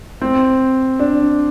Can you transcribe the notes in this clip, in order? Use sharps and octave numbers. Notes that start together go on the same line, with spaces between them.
C4
D4